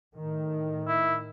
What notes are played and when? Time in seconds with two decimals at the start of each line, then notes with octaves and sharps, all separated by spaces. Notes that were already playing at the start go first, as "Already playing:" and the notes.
0.17 A2 D#3
0.88 E4